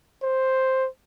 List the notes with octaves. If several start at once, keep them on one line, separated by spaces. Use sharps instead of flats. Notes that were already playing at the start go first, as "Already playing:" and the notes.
C5